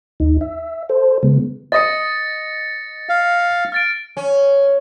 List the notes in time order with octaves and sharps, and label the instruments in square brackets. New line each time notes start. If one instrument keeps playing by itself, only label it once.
[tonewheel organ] D#2 D#4
E5
A4 C5
C#3 G#3 B3
[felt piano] D#5 D#6 [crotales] A6 A#6 C#7
[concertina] F5
[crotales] F6 A6 D7
[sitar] C#4